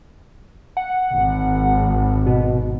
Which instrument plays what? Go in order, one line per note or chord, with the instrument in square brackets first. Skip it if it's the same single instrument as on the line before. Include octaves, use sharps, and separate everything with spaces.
[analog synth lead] F#5
[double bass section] G#1
[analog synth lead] B2